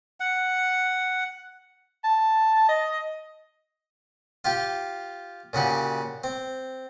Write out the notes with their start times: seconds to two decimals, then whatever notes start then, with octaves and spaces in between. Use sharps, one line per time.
0.20 F#5
2.04 A5
2.69 D#5
4.45 F4 G4 F5 G5
5.53 A#2 C#3 F#4 G4
6.24 C4